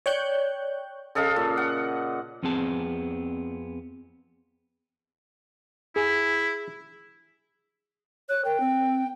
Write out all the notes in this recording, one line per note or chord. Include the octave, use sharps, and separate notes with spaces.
C#5 D5 G5 C#6 F#6 G6
C#3 A4 D#5 F5
A#2
F#5
F2 B3 C4 G#4 A5
E4 G#4
C#5 F#6
A#4 G5
C4